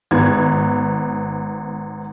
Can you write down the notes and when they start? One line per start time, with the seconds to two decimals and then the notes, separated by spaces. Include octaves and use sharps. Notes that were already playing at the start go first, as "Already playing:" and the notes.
0.11 G#1 B3 G#6